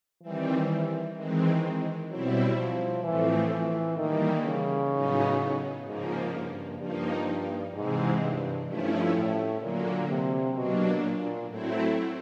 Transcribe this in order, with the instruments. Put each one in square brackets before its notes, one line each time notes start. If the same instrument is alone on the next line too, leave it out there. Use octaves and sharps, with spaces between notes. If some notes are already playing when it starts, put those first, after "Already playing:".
[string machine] D#3 G3 C4 [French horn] E3
[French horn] D#3 [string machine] E3 G#3 C4
[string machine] B2 G3 C4 E4 [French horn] F#3
[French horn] F3
[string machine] A2 F3 A3 C4 [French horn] E3
[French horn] E3
[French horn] D#3 [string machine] E3 G3 A#3
[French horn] C#3
[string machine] A2 F#3 B3 D#4
[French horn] G#2 [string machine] C#3 F3 A#3
[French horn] G2
[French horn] G2 [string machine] F3 A#3 D#4
[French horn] G#2 [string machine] C3 E3 G#3 C4
[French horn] G2
[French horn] G2 [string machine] F3 A3 C#4 E4
[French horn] A2
[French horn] A#2 [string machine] D3 F#3 A#3
[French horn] C3
[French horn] B2 [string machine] F#3 A#3 D4
[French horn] A#2
[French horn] A2 [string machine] F#3 A3 C4 E4